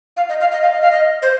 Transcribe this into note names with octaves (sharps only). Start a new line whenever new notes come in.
F5
D#5
F5
D#5
F5
D#5
F5
D#5
C5